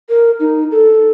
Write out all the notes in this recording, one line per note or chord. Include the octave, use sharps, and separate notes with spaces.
A#4
D#4
A4